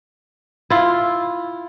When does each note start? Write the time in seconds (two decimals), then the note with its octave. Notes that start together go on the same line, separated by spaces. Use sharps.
0.70 E4 F4